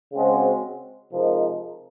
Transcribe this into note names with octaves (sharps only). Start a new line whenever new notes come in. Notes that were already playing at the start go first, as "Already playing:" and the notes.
C#3 G#3 C4 F#4
C3 F3 G#3 D#4 A#4